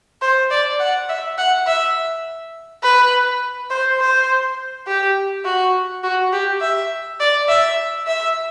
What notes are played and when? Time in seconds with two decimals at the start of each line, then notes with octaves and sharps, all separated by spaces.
0.22 C5
0.51 D5
0.80 F#5
1.09 E5
1.38 F#5
1.67 E5
2.83 B4
3.70 C5
4.00 C5
4.87 G4
5.45 F#4
6.03 F#4
6.33 G4
6.61 E5
7.20 D5
7.48 E5
8.07 E5